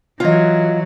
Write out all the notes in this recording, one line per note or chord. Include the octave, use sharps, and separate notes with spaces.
E3 F#3 F4 D#5